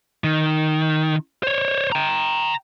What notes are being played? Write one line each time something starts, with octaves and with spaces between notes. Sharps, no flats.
D#3
C5 C#5
G5 A#5